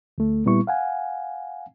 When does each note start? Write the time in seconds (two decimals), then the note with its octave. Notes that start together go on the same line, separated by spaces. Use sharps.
0.18 D2 A3
0.46 A#2 G3 B3 E4 C#6
0.67 F5 F#5 G#5